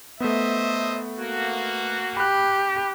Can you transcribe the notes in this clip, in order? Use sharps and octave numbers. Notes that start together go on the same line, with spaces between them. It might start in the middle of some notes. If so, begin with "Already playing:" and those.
A3 B3 C5 D#5 E5
A#3 F#4
G4 B5 F#6